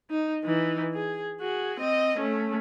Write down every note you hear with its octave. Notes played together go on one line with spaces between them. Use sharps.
D#4
E3 D#4
G#4
F#4 G#4
C4 D#5
A3 C#4